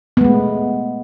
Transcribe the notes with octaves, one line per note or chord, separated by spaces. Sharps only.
G#3 A3 B3